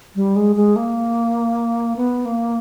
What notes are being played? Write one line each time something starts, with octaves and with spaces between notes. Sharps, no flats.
G3
G#3
G#3
A#3
B3
A#3